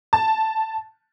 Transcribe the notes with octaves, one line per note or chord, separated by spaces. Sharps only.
A5